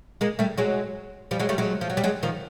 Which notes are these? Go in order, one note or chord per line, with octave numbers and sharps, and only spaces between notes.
G#3 A#3
G3 A3
F#3 G#3
F3 G3
F#3 G#3
G3 A3
F#3 G#3
F3
F#3
G3
F#3 G#3
D#3 F3